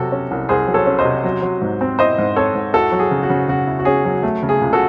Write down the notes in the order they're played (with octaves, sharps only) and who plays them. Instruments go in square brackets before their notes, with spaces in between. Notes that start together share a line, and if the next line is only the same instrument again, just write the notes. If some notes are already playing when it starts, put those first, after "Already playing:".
Already playing: [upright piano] C3 F#3 F#4 A4
C#4
C2
C2 G#4 C5
F#3
A4 C#5
C#4
C5 D#5
C3
F#3
F#3
G#2
C4
E4 C5 D#5
G#2
C4 A4 C#5
G#2
E4 F#4 A4
F#3 F#4
G#4
C#3
F#4
C#3
C#3 F#4
E4
F#4
C#4 G#4
F#3
A3
C#3
G#4
C#2
F#4 A4